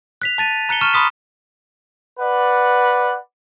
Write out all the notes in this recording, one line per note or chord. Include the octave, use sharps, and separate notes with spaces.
F#6 B6 F7
A5 A6 D#7
A#5 F#6 C#7 G7
C#6 F6 D#7 E7
B5 C6 D#6 B6
B4 D5 F#5